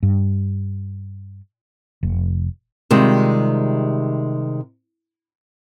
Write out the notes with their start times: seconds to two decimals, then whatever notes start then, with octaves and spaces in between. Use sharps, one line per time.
0.03 G2
2.03 F1
2.91 C3 D#3 G3 G#3 F4